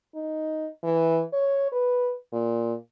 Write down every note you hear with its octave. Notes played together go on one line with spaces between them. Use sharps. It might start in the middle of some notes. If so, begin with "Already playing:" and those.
D#4
E3
C#5
B4
A#2